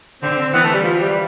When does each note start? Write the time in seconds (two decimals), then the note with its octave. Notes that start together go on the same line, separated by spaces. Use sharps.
0.22 D3 C4
0.38 C4
0.53 E3 B3
0.64 A3
0.73 G3
0.84 F3
0.99 G3
1.09 G3